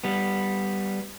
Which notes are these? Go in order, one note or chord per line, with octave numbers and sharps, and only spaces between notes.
G3 B3